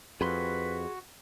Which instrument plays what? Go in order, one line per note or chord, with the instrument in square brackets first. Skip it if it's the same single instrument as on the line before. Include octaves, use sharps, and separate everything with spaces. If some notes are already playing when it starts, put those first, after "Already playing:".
[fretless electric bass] F2 [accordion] F#4 [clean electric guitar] G#4 B5 C6 [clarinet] B4